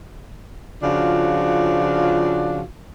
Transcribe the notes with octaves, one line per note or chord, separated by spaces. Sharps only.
C#3 F3 D4 F4 F#4